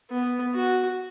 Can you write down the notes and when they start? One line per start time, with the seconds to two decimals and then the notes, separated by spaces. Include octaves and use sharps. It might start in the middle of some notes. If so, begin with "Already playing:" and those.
0.10 B3
0.55 F#4